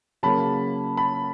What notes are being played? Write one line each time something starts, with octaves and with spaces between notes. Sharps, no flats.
C#3 F#3 A#3 A5 B5
A5 B5